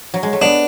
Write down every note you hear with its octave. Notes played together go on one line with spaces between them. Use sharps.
F#3
G#3
A3
B3 D4